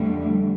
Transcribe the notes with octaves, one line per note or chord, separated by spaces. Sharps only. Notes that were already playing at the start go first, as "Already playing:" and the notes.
Already playing: F2 D3 G3 A3